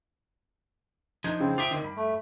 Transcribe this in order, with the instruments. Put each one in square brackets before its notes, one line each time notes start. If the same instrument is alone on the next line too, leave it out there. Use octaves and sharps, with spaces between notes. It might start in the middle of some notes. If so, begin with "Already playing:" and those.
[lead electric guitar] F3 D4 [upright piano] D#4 [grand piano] G#6
[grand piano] C#3 [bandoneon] C4
[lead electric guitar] F4 E5 [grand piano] D6 D7 [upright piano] D#6
[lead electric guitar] D2 D3 [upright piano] D#3
[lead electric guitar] G2 [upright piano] B5
[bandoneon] A3